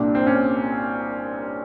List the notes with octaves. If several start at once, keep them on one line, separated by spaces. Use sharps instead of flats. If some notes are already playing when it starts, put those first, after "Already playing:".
Already playing: C2 A#2 D4
C4
C#4